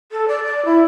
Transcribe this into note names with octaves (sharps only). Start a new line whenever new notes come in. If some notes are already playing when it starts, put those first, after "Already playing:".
A4
D5
D5
E4